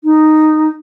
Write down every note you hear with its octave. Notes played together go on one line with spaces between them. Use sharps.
D#4